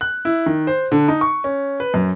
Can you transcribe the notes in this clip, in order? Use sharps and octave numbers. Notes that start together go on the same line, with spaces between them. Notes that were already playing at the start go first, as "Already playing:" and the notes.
F#6
E4
D#3
C5
D3
D#4
C#6
C#4
B4
F#2